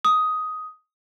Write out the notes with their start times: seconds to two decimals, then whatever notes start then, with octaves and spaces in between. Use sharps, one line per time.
0.05 D#6